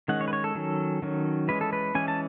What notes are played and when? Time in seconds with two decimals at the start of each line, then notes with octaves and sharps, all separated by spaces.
0.08 D#3 G#3 C#4 F#5
0.21 C#5
0.28 B4
0.33 C#5
0.44 A4
0.55 D#3 F#3 C#4
1.02 D#3 F#3 C#4
1.48 E3 G#3 C#4 B4
1.61 A4
1.73 B4
1.95 E3 G#3 C#4 G#5
2.08 A5